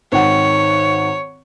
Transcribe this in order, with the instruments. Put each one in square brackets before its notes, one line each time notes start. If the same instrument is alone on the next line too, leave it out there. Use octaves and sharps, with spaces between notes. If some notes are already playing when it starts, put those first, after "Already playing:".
[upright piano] G#1 D#3 F#5 [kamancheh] C#5